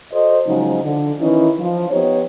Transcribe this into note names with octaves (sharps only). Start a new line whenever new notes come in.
F#4 A4 C5 D#5
C#3 F3 F#3 G#3 D#4
D3
D#3 E3 C#4 D#4 E4
F3
B3 D#4 G4 C#5